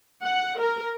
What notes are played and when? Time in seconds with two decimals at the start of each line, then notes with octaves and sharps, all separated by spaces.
0.24 F#5
0.60 A#4